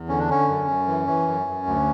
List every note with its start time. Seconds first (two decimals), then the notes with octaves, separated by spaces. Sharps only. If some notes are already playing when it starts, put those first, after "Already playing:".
Already playing: E2
0.09 D3 C#4
0.19 D4
0.28 D3 C#4
0.48 F#2
0.68 F#2
0.88 E3
1.07 E3
1.28 F#2
1.48 F#2
1.67 D2